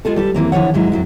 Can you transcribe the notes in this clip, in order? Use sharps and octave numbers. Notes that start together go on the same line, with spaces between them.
G#3 F4 G#4 A4
G3 A4 B4
F#2 E3 A#3 C4
D3 E3 F3 C#5 F#5
G#2 F#3 G#3 E4
F2 F#3 E4